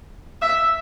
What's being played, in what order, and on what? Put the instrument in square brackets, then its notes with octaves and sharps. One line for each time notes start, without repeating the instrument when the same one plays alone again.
[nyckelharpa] E5